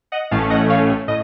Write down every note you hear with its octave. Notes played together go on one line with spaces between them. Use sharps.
D#5 F#5
A1 A2 A3 C#4 F5 A5
D#5 F#5
C#5 F5
A2 D#5